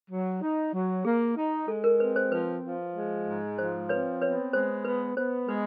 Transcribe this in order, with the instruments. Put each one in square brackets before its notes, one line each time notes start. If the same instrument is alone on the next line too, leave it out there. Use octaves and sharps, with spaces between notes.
[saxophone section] F#3
D#4
F#3
[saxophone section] A#3 [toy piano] G#4
[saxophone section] D#4
[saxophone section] G#3 [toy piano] A4
[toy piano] A#4
[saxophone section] C4 [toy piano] B4
[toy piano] C5
[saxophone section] F3 [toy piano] B4
[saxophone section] F3
G#3
G#2
[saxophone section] F3 [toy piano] C5
[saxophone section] C4 [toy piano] B4 C#5
[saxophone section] B3 [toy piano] B4 C#5
[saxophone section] G#3 [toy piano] C5
[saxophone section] B3 [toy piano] B4
[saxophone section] B3 [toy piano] C5
[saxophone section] G#3 [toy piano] B4